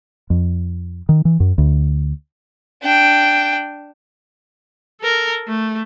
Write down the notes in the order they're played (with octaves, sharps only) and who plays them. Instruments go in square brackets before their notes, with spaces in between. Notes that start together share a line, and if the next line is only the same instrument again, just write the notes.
[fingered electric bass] F2
D#3
E3
F#2
D2
[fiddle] D4 G5
[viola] A4 A#4
A3